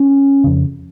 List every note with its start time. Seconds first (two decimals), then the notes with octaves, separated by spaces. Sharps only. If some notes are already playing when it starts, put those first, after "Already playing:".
Already playing: C#4
0.44 F2 C#3